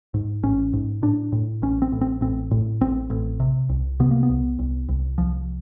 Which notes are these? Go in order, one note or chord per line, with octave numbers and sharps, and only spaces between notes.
G#2
A1 C#4
G#2
A2 D4
A2
A1 C#4
C4
A1
C4
A1 C4
A2
A1 C4
A1
C3
C2
C3 B3
A#3
B3
C2
C2
C2
C2 F3